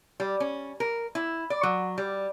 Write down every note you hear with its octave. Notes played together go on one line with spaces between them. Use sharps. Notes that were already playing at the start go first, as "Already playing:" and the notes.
G3
C#4
A#4
E4
D5
F#3
G3